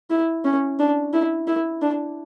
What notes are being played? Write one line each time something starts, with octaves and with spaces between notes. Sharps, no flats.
E4
C#4
D4
E4
E4
D4